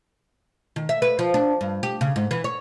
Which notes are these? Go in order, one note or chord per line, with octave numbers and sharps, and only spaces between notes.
D#3
E5
B4
F3
D4
G2
G4
C#3
G#2
E3
C#5